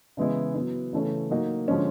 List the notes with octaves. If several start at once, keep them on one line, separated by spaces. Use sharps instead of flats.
C#3 E3 G#3 B3 E4
F#3 B3 E4
C#3 E3 A3 C#4
F#3 A#3 D#4 F#4
D3 F3 G#3 C#4